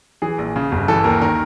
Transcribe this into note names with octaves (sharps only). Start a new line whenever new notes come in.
E3 G#4
A#1
C#3
G1
E3 A4
D#2 A#4
D#3 A#4